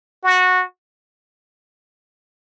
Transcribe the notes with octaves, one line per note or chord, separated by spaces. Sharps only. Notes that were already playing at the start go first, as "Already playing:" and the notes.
F#4